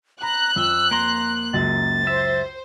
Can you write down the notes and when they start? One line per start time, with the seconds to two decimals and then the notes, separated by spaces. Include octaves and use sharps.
0.22 A#5 B5 F#6
0.56 F2 E6 G7
0.91 A#3 A#5 C6
1.53 C#2 F#2 A6
2.07 C5 E5